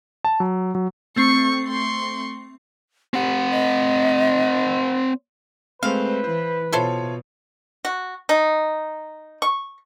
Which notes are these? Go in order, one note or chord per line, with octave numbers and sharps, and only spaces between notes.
A5
F#3
F#3
A3 C4 C#6 C7
C6 C#6
C4 G4 F#5
D#5
G#3 A3 C4 B4 C5 F5
E3 C5
B2 E4 F4 A4 C5 C#5
F#4
D#4
C#6